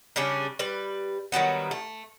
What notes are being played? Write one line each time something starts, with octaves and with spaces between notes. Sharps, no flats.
C#3 G3 C#4 D4
G3 B4
D#3 F#3 G3 B3
A3